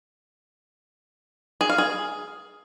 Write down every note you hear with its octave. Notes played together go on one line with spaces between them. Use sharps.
G#4
F5
G#4